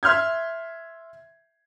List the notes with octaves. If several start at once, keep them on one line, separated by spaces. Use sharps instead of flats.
E5 C6 F6 G6 G#6